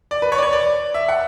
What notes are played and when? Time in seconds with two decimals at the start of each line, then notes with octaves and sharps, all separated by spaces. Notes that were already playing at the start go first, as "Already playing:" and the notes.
0.11 D5
0.22 B4
0.32 C#5
0.38 D5
0.43 C#5
0.53 D5
0.94 E5
1.08 F#5